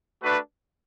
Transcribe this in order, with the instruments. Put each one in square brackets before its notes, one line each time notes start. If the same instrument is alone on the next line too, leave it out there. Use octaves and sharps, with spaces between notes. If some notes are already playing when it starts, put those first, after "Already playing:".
[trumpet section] A3 D4 F#4 B4